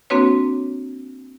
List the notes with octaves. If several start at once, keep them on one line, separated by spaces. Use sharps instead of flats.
A#3 C4 D4 F#4 B4 C#5